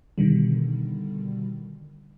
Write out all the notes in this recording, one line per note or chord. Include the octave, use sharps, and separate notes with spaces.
B2 D3 D#3 G3